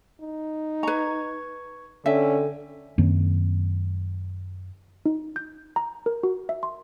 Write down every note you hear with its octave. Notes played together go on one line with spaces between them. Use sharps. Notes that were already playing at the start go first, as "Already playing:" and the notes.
D#4
B4 A#5 C#6 G#6
D3 C#4 A4 E5 G5 G#5
F#2 D#3 A#3 C4
D#4
G6
A#5
A#4
F#4
E5
C6